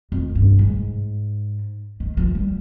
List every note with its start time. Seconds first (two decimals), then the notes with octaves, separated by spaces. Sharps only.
0.12 F2
0.35 G2
0.59 G#2
2.00 D#3
2.17 F3
2.35 G3